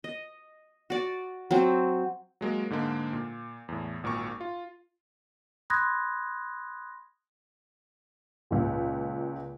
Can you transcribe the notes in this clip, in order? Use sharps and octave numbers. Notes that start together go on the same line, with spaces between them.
D#5
F#4 D5
F#3 C4
F#3 G#3 A#3
G#2 D3 G#3 A#3
A#2
E2 A2
G#1 A#2 A#4 C#6
F4
B5 C6 D#6 F#6 G#6 A#6
C#2 A#2